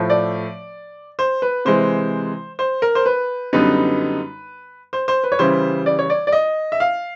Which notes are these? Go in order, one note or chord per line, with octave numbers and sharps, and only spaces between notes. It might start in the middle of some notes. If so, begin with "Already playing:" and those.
Already playing: A2 F3 A3
D5
C5
B4
C3 E3 G#3 C5
C5
A#4
C5
B4
F#2 D3 G3 B3 D#4 B4
C5
C5
B4
C#5
C#3 E3 G3 C5
D5
C#5
D5
D5
D#5
E5
F5